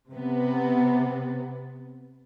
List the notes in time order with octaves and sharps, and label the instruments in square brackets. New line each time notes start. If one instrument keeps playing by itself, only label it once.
[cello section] C3 B3